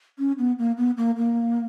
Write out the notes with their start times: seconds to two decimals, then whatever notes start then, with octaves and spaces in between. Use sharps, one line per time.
0.19 C#4
0.38 B3
0.59 A#3
0.77 B3
0.97 A#3
1.17 A#3